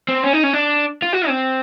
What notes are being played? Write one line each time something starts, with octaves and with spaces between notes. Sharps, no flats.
C4
C#4
D#4
C#4
D4
F4
F#4
C4